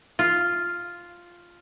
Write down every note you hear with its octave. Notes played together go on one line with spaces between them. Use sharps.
F4